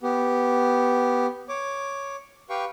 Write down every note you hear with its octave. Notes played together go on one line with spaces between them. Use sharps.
B3 G4
C#5 D6
G4 B4 F5 G5 C#6